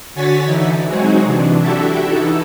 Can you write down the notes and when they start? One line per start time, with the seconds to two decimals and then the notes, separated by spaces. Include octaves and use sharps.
0.15 D3 F#4 C#5 G#5 A6 B6
0.44 D3 E3 D#4 E4
0.87 F#3 G#3 C4 D#4 F#4 G#4
1.24 C3 E3 D4
1.61 D4 E4 F#4 G4 A4 E5
2.07 E3 D#4 E4 A4